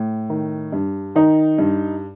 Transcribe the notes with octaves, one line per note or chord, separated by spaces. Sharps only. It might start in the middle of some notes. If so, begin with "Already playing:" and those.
Already playing: A2
D#3
G2
D#3 D#4
G2